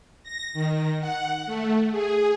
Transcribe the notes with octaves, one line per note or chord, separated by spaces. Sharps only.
A#6
D#3
F#5
A3
G#4